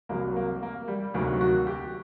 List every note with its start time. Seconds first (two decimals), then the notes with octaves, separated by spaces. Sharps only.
0.09 C2 C3 F#3 A#3
0.36 A#3
0.63 A#3
0.88 G3
1.14 D2 C3 D#3 F#3 A#3
1.41 F#4
1.67 G4